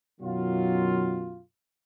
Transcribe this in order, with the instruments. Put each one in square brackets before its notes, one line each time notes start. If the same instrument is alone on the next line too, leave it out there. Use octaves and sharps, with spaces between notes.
[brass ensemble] F#2 B2 D#3 F#3 F4